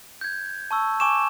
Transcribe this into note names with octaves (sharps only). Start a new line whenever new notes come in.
G6 G#6
A5 C#6 E6
G#5 C#6 D6 E7